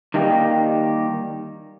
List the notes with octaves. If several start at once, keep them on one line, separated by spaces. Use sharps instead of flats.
D#3 G3 A#3 D#4 G4